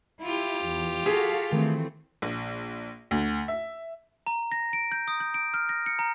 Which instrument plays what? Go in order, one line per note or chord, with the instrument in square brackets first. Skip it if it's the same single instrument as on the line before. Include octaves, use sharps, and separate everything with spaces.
[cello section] E4 [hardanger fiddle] F4 G4
[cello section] E2
[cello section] F#4 A4 F5 [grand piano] G#4 [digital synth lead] B6
[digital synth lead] D#3 [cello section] E3 A3 C4
[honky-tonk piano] A#1
D2
E5
[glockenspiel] A#5
A#6
D7
G6
D#6
G6
D7
F6
A#6
C#7
A#5